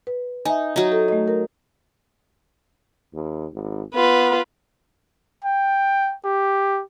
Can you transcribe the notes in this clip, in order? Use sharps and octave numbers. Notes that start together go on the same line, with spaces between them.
B4
D#4 E5 G#5
F#3 D#4
A4
A3 D#5
A#4
D#2
G#1
B3 F4 B4
G5
G4